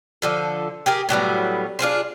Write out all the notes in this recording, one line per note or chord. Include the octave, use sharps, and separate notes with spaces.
D3 F3 A4
G4 G#4 A#4
A2 F#3 G3 B3
D4 F4 G#4 C5